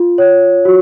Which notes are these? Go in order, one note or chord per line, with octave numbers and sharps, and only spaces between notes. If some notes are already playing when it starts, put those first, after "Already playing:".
Already playing: F4
C#5
F#4